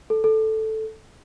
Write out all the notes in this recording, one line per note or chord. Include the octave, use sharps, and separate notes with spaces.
A4
A4